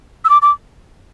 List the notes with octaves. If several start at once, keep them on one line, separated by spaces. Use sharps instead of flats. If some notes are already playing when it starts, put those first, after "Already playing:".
E6
D6
D6